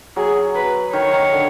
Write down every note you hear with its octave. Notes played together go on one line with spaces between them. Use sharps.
F#3 G#4
B4
D#3 C#5
D#3
D3